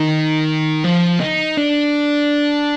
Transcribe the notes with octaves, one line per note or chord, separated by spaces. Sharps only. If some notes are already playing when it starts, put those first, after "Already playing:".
Already playing: D#3
F3
D#4
D4